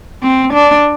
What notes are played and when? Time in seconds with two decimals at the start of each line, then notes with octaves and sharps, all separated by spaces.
0.23 C4
0.54 D4